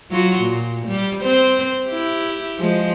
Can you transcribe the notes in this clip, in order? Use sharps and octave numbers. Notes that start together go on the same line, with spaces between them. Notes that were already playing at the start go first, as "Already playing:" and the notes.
F#3 F4 F#4
A#2
G3
C4 C5
E4 G4
F3 G#3